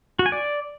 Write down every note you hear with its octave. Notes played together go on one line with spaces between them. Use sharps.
F#4
G#5
D5